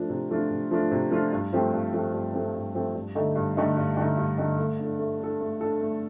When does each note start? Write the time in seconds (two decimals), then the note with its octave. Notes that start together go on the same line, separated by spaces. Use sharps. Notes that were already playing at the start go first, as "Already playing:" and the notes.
Already playing: F3 A3 D4 F4
0.10 C3
0.30 F3 A3 D4 F4
0.51 C3
0.71 F3 A3 D4 F4
0.92 C3
1.11 F3 A3 D4 F4
1.33 G2
1.53 F3 A3 C4 G4
1.73 G2
1.93 F3 A3 C4 G4
2.13 G2
2.34 F3 A3 C4 G4
2.54 G2
2.75 F3 A3 C4 G4
2.95 G2
3.15 D3 A3 D#4
3.36 G2
3.57 D3 A3 D#4
3.77 G2
3.97 D3 A3 D#4
4.17 G2
4.38 D3 A3 D#4
4.58 A3
4.79 D4 A4
4.99 A3
5.19 D4 A4
5.41 A3
5.61 D4 A4
5.81 A3